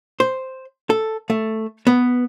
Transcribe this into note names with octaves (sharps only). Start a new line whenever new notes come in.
C5
A4
A3
B3